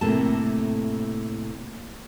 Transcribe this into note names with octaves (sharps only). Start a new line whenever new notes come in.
A2 C3 A#3 A4 A5